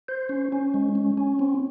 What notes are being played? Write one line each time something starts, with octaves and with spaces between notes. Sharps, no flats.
C5
C#4
C#4
G#3
C#4
C#4
C4